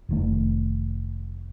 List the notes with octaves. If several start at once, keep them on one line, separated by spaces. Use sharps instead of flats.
F1 D#3 A3